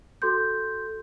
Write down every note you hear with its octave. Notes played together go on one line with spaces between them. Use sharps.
F#4 A4 C6 G6